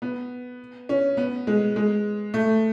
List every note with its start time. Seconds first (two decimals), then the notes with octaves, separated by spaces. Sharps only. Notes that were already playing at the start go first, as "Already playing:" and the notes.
0.02 B3
0.89 C#4
1.17 B3
1.47 G#3
1.76 G#3
2.34 A3